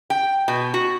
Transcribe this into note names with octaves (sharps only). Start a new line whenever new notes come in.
G5
B2
F#4